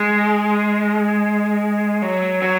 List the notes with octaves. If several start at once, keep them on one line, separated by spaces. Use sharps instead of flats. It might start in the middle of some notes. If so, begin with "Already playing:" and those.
Already playing: G#3
F#3
F#3